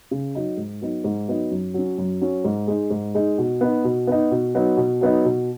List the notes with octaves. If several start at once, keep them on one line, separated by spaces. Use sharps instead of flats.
C#3
F#3 D#4
G#2
F#3 B3 D#4
G#2
F#3 B3 D#4
F#2
F#3 C#4
F#2
F#3 C#4
G#2
G#3 D#4
G#2
G#3 D#4
B2
B3 D#4
B2
B3 D#4
B2
F#3 B3 D#4
B2
F#3 B3 D#4
B2